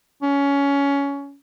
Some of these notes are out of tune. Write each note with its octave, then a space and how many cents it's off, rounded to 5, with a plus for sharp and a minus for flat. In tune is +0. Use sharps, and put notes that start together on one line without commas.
C#4 +20